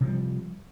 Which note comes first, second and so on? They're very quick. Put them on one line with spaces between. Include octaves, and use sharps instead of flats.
C3 F3 G3